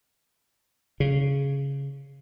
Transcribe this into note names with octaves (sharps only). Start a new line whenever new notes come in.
C#3